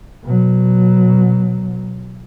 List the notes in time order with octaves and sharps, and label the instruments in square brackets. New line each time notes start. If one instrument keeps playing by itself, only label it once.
[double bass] B2 F#3